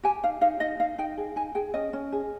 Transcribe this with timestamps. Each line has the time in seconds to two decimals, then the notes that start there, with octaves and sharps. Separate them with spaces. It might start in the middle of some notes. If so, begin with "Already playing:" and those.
0.03 G4 G#5
0.23 D#4 F5
0.41 D#4 F5
0.60 D#4 D#5
0.80 D#4 F5
0.98 D#4 G5
1.17 G#4
1.36 D#4 G#5
1.55 G#4 G5
1.74 C#4 D#5
1.93 C#4
2.12 G#4